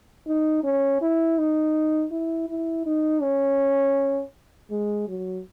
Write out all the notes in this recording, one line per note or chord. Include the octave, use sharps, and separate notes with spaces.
D#4
C#4
E4
D#4
E4
E4
D#4
C#4
G#3
F#3